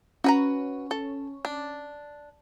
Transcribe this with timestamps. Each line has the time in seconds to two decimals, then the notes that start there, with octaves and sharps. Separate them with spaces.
0.24 C#4 F#4 B4 A#5
0.91 A4
1.45 D4